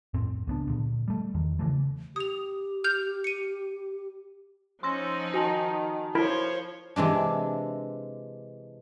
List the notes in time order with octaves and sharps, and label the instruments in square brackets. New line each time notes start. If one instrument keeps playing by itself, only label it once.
[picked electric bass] F2 A2 C4
C#2 B3 D4
A#2 D3
G3 A3
E2 D#3
C#3 E3 A3
[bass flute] G4 [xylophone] D#6 F7
[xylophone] F6 G6 F7
C#7 D#7
[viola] F3 D#4 [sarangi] C#4 [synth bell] C6 E6 A#6
[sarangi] D#3 [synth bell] F#4 G#5 A5
[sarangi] F3 [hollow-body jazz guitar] E4 A#4 B5 [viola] C5 C#5
[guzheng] C3 E3 G#3 D4